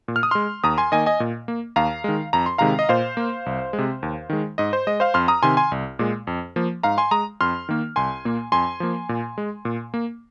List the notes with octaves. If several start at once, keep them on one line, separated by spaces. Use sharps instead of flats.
A#2
F6
D#6
G#3 C6 F6
D#2 A#5 D#6
G#5 C6
D#3 A#3 D#5 G#5
D#5 G#5
A#2
A#3
D#2 F5 A#5
D#3 G#3
F2 A#5
C6
C3 D#3 G#3 F5 A#5
D#5
A#2 C5 F5
A#3
C2
G#3
C3
D#2
D#3 G#3
G#2 D#5
C5
G#3 D#5
C5 F5
F2 C6 F6
A#5 D#6
C3 D#3 G#5 C6
G#5 C6
C2
A#2 G#3
F2
F3 A#3
G#2 F5 A#5
G#5 C6
G#3 A#5 D#6
F2 C6 F6
D#3 A#3
C2 G#5 C6
A#2 A#3
F2 G#5 C6
F3 A#3
A#2
G#3
A#2
A#3